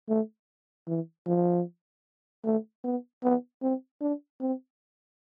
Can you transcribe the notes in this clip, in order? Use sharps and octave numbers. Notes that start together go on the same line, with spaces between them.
A3
E3
F3
A3
B3
B3
C4
D4
C4